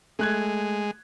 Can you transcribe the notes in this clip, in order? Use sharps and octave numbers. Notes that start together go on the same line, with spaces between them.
G#3 A3 F#6 G#6